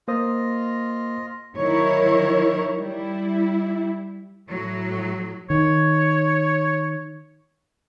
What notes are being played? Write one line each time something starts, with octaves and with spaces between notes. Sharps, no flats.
A#3 F4 C5 D#5 D#6
D#3 F#3 E4 A#4 C#5
G3 E4
A2 F#3
D#3 C#5